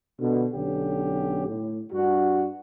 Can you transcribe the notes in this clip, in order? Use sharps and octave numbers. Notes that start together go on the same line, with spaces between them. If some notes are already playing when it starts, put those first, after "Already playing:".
B2 D3
B1 D3 C#4 G4
A2
G2 D4 F#4